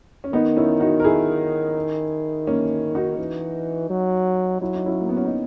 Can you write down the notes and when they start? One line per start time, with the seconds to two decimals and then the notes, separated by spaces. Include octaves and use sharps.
0.24 C#4
0.33 D#3 B3 D#4
0.57 C#4 E4
0.80 D#4 F#4
1.00 A#4
1.04 E4 G#4
2.47 A#3 C#4
2.95 D#4 F#4
3.19 E3
3.90 F#3
4.61 F#3 E4
4.74 D#4
4.86 C#4 E4
5.01 A#3
5.09 B3
5.17 C#4
5.25 D#4